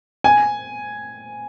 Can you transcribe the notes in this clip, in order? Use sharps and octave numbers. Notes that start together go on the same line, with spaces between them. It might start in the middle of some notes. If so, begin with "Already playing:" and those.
G#5